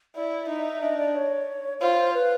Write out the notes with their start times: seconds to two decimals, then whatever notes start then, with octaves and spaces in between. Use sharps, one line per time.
0.15 E4 D5
0.49 D#4 E5
0.82 D4 D#5
0.98 D5
1.15 C#5
1.81 F4 C5
2.14 B4